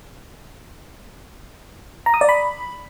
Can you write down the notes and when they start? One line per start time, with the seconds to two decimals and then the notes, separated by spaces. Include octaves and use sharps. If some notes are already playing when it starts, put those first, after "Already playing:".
2.06 A#5
2.14 D#6
2.21 D5
2.29 B5